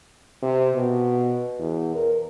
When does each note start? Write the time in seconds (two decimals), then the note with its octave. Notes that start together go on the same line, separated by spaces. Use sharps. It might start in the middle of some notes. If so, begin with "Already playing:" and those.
0.42 C3
0.75 B2
1.59 E2
1.95 A#4